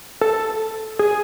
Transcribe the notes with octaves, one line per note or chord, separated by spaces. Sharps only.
A4
G#4